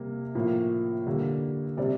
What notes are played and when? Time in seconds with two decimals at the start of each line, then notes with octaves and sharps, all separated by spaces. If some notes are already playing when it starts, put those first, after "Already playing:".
Already playing: C3 G3 A#3
0.35 A2 F3 A#3
1.07 D3 G3 A#3
1.77 C3 G3 C4 D5